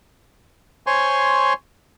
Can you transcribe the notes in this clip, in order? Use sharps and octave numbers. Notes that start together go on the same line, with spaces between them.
C5 C#5 G#5 C6 C#6